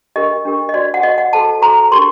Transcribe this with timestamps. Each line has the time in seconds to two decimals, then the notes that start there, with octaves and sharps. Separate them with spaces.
0.16 D4 G4 A#4 D#5
0.45 D4 G4 A#4
0.69 D#5
0.74 F#4 C5 D5
0.94 F#5
1.03 F#4 C5 D#5
1.18 F#5
1.33 F#4 A4 C5 A5
1.61 F#4 A4 C5 A#5
1.91 D4 G4 A#4 C6